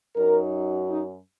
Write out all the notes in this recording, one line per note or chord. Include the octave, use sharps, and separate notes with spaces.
F#2 F#3 D#4 A#4
D#4